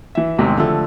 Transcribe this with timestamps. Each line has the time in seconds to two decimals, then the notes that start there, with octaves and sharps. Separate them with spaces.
0.15 E3 E5
0.38 A1 E2 G#2 C3 D#3
0.57 D3 F3 A3